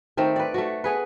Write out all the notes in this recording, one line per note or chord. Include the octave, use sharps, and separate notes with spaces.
D#3 A3 C4
B4 D5
A3 F#4
B3 G#4 B4